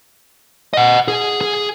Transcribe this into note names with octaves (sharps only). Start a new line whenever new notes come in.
D#5 F#5
G#4
G#4